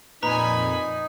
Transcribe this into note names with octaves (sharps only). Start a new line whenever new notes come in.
F2 A#2 D#4 B4 G#5 A#5 B5